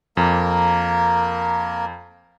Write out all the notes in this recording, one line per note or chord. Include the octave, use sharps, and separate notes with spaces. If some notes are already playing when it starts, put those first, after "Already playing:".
F2 A#3 A#4